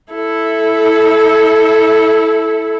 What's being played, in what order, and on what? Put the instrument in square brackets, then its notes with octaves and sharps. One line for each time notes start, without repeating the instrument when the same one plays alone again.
[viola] E4 A4